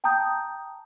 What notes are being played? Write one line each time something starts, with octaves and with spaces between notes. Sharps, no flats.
G5 A5 A#5 D#6 G6